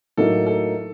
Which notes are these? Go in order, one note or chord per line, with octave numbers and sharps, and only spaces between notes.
A2 F#3 A#3 D#4 A4
A4